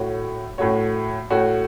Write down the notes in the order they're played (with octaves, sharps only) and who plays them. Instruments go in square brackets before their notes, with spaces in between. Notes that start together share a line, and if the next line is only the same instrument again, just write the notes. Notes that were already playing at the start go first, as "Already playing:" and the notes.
Already playing: [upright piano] A2 A3 F#4 C#5
A2 A3 F#4 C#5
A2 A3 F#4 C#5